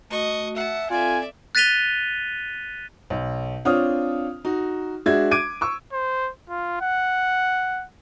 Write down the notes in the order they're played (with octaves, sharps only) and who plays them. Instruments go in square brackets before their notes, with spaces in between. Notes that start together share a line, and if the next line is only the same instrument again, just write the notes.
[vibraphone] A3 F#4 [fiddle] D#5 C#6
[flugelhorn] E5 [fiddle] F#5 A5
[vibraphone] C4 A4 [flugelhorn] F4 [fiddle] D5 E5 [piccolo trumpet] G#5
[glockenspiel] F#6 A6 B6 D#7 F7 G7
[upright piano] B1
C4 D4 F4 C#5 D#6 F6
D#4 F#4
G#3 D4 F#4 E5 G#6
D6 G#6 D7 D#7
C#6 E6
[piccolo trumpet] C5
F4
F#5